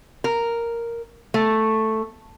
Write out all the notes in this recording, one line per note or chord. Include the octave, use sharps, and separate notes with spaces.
A#4
A3